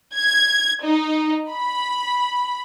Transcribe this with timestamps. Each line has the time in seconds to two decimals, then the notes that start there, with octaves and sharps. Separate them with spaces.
0.16 G#6
0.83 D#4
1.50 B5